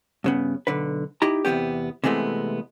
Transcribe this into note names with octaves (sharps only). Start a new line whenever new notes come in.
G2 C#3 B3
B1 D3 B4
D#4 E4 G4 A#5
E2 C3 F3 B3 C#4 G4
C3 E3 G#3 A3 B3